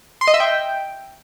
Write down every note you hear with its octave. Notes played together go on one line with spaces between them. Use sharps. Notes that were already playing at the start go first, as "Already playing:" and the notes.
C6
D#5
E5
G5